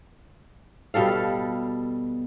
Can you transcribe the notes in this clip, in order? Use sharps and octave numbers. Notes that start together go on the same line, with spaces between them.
B2 G3 A4 F5